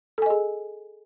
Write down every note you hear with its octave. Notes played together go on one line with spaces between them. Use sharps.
G#4 A4 D#5 G#5